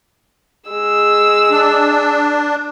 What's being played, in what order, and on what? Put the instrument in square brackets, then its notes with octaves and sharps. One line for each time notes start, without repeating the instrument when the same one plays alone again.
[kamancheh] G#3 E6
[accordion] D4